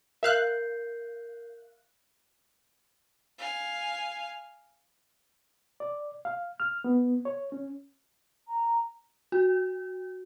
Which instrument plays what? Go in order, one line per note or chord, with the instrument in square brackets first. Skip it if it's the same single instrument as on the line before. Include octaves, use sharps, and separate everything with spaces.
[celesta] A#4 G6 C7 [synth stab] E5 F5 F#6
[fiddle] F5 G#5
[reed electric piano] D5
F5
F6
B3
C#5
C#4
[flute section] A#5
[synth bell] F#4